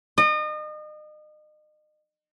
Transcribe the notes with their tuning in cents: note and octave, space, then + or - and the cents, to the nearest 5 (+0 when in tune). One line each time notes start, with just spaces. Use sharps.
D#5 -35